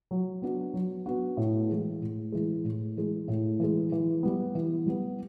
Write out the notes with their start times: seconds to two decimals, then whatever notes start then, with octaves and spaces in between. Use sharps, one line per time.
0.11 F#3
0.42 B3 D4 F#4
0.74 F#3
1.06 B3 D4 F#4
1.37 A2
1.69 E3 G#3
2.01 A2
2.32 E3 G#3
2.64 A2
2.97 E3 G#3
3.28 A2
3.60 E3 G#3
3.92 E3
4.23 G3 B3
4.55 E3
4.86 G3 B3